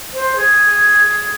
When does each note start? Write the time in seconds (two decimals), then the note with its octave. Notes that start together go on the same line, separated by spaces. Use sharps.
0.13 C5
0.35 G#4